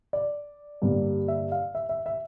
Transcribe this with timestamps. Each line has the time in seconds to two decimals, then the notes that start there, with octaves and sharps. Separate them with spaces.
0.13 D5
0.82 G2 D3 G3 A#3
1.28 E5
1.52 F5
1.75 E5
1.89 E5
2.06 E5